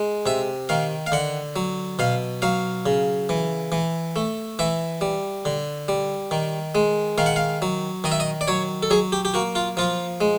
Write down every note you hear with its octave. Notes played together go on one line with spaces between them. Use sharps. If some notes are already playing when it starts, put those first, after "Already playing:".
Already playing: G#3
C3 E5
D#3 F5
F5
D3 F#5
F#3
B2 F5
F#3 F5
C#3
E3
E3
A3
E3 E5
G3
D3
G3
D#3
G#3
D#3 F5
F#5
F5
F#3
D#3 D#5
E5
D#5
D5
F#3 C#5
A4
F#3 G#4
G4
G4
A#3 F#4
F4
F3 F4
G#3